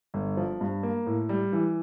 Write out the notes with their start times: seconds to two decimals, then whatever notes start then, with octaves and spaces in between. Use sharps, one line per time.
0.14 G1
0.37 F3
0.61 G2
0.83 A#3
1.07 A2
1.29 G3
1.53 E3